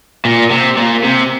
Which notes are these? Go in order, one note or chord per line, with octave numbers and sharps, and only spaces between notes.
A#2
C3
A#2
C3